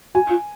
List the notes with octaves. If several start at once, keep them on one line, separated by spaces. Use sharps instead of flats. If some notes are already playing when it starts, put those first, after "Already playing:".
F#4 G#5
F4